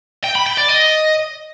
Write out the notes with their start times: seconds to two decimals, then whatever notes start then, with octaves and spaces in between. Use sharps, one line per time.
0.24 G5
0.35 B5
0.47 G5
0.58 D5
0.69 D#5